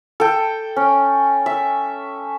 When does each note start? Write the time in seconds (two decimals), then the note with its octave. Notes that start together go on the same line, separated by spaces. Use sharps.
0.20 A4 G5
0.76 C#4
1.46 E5